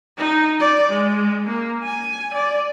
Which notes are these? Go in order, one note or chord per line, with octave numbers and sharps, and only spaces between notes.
D#4
D5
G#3
A#3
G#5
D5